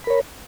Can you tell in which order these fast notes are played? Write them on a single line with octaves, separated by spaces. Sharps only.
B5 A#4 C#5